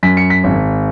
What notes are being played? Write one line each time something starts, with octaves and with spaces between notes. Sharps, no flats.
F#2 B6
C#7
B6
G#1